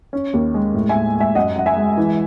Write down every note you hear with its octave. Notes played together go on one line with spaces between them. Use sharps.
C#4
D#2
G#3
A2
A2 E5 G#5
G#3
E5 G#5
F#2 D#5 F#5
F#2 F#5
E5 G#5
G#3
E3